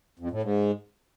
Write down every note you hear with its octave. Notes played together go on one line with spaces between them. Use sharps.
F2
A2
G#2